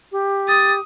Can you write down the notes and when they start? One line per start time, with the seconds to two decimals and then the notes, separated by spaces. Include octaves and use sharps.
0.12 G4
0.48 D#6 A6